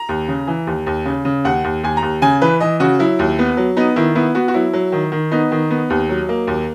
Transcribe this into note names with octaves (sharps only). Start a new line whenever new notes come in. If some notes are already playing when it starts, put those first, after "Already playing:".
Already playing: A#5
D#2
C#3
E3
D#2
D#2
C#3
C#3
D#2 F#5
D#2
D#2 G#5
A#5
D#2
C#3 G#5
E3 B4
E3 D#5
C#3 F#4
F#3 E4
D#2
B3
F#3
B3 D#4
D#3 E4
B3 E4
B3 F#4
F#4
F#3 E4
F#3
D#3
D#3
B3 D#4
D#3
B3
D#2
F#3
A#3
D#2